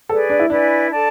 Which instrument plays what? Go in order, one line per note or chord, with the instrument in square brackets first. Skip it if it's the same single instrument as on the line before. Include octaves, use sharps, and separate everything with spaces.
[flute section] G#4 B4 D5 [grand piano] A4
[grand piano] D4
E4
[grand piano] D4 [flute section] E4 B4 D5 G#5
[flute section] A4 D5 A5